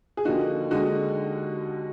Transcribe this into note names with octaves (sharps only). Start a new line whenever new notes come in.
G#4
D#2 D3 F3 A#3 D#4 F#4
D#2 D3 G#3 D#4 F#4